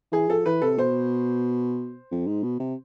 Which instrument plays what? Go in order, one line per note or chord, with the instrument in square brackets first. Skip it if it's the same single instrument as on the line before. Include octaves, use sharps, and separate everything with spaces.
[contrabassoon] E3 [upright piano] G#4
[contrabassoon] F3 [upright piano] A4
[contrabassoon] E3 [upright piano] B4
[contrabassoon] C3 [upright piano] A4
[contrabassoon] B2 [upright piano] C5
[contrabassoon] F2
G#2
B2
C3